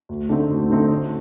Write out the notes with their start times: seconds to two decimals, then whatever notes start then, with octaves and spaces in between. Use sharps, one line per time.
0.09 D2
0.29 D3 A3 C4 D#4
0.49 D2
0.70 D3 A3 C4 D#4
0.90 A1